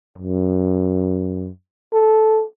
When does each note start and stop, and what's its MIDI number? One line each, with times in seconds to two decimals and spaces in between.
0.18 1.49 42
1.93 2.44 69